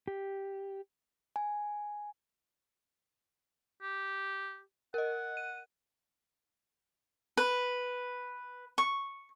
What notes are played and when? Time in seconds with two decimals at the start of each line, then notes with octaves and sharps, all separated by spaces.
0.08 G4
1.36 G#5
3.82 G4
4.94 A#4 D#5 F#5
5.37 D#7
7.37 B4
8.78 C#6